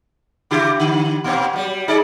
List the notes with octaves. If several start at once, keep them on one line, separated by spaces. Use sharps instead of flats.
C#3 E4 G4
D3
A#2 B3 C4
F#3 G3
D#4 G#4 D5